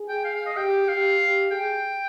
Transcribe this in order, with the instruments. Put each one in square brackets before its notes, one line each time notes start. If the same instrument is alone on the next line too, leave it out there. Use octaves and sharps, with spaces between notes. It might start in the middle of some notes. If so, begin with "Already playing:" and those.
Already playing: [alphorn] G#4
[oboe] G5
F5
F5
D#5
[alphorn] G4 [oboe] G5
[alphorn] G4 [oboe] F5
[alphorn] G4
[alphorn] G#4 [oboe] G5